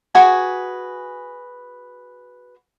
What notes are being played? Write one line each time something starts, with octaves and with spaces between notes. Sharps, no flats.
F#4 G#4 B4 G#5